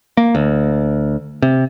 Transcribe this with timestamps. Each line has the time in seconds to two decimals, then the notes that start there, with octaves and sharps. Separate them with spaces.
0.17 A#3
0.35 D2
1.42 C3